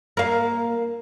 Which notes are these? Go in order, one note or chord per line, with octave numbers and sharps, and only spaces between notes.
A#3 F5